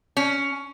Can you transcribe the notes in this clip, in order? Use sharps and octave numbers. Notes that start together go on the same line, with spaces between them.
C#4